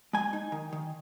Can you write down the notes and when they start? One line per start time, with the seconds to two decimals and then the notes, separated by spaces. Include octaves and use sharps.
0.13 G#3 G#5
0.33 D#4
0.52 D#3
0.72 D#3